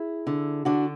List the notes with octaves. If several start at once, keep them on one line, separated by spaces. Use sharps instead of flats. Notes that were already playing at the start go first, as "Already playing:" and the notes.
Already playing: E4 G#4
D3
D3 D4 F#4